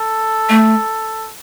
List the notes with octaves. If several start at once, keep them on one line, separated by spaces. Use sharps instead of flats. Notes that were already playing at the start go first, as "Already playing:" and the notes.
Already playing: A4
A3